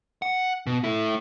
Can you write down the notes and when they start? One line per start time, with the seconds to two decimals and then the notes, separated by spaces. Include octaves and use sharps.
0.22 F#5
0.67 B2
0.84 A3 E4